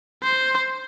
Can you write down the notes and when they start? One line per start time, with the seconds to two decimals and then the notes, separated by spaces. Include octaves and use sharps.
0.23 C5